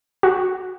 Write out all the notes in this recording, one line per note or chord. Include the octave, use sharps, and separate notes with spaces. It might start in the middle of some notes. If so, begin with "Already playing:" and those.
F#4